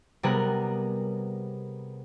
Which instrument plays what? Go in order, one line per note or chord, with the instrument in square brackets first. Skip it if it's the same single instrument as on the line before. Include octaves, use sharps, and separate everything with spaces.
[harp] C3 G3 B3 G#4 A#4 F#6